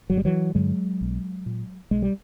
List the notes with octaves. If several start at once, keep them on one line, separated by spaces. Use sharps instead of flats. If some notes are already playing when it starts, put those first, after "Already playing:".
G1 F#3
G3
E3 F#3
G2 D3 F#3 G#3
B1
A#2
B1 G#3
G3